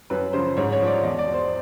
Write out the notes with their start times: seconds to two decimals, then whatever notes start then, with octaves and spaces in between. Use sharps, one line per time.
0.10 F#2 B4
0.33 C#3 F3 C5
0.57 G#2 C#5
0.72 C#5
0.81 F3
0.87 D5
1.03 E2 D#5
1.18 D5
1.26 B2
1.34 C5